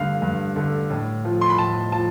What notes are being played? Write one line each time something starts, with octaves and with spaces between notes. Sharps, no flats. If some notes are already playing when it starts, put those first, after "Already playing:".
Already playing: G2 D3 A3 F5
G2
D3 A3
A2
F3 A3
C6
B5
A2 A5
F3 A5